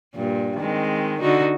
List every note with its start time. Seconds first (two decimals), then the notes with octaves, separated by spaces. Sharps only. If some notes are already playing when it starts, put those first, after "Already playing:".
0.14 G2 A#2
0.58 D#3 G#3 C4
1.21 D3 D#4 F#4